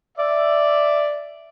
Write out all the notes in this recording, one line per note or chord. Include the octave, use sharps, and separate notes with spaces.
D5 E5